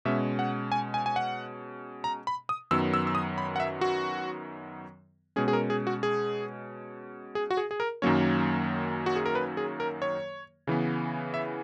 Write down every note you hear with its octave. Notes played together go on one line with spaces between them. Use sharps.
B2 G#3 C#4 E5
F#5
G#5
G#5
G#5
F#5
A#5
B5
D#6
F#2 D#3 F#3 B3 E6
E6
E6
D#6
B5
F#5
E5
F#4
B2 G#3 C#4 G#4
G#4
A#4
G#4
F#4
G#4
G#4
F#4
G#4
G#4
A#4
F#2 D#3 F#3 A#3 C#4 C#5
F#4
G#4
A#4
B4
G#4
A#4
C#5
C#3 E3 B3
E5